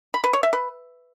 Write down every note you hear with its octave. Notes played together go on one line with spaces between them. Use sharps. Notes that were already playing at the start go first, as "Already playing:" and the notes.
B5
B4
C#5
E5
B4